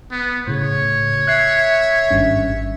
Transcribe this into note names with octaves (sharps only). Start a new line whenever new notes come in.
B3
A2 C#3 C#5
E5 F#6 G#6 C7
G#1 G2 C#4